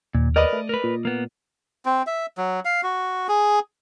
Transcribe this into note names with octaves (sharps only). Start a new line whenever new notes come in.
D#2 A#2
A#4 B4 D5 D#5
A3
A#4 B4
A#2
A#3 B3
C4
E5
F#3
F5
F#4
G#4